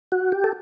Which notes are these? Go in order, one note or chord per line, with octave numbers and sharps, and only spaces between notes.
F#4
G4
A4